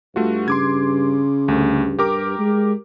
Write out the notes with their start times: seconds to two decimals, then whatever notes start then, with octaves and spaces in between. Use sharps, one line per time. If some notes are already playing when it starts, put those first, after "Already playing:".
0.16 G2 A3 F4 F#4
0.48 C#3 C6 D6 G#6
1.48 D2 G2 A3
1.99 G4 A#4 D6
2.39 G#3